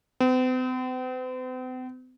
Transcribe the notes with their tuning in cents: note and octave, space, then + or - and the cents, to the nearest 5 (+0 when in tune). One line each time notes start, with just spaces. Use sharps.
C4 -45